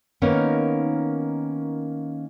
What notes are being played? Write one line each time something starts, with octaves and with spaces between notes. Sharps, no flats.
D#3 A#3 B3 C#4 D#4